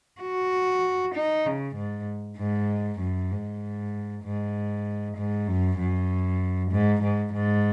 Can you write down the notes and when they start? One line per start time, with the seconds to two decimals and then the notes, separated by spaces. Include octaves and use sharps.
0.21 F#4
1.15 D#4
1.46 C#3
1.76 G#2
2.38 G#2
3.00 F#2
3.31 G#2
4.24 G#2
5.17 G#2
5.48 F#2
5.78 F#2
6.71 G#2
7.03 G#2
7.33 G#2